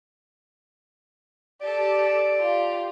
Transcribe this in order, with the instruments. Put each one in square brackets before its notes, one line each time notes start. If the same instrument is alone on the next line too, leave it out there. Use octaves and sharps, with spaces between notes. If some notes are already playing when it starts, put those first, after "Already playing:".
[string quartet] G4 A4 [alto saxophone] D5
[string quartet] F4 G4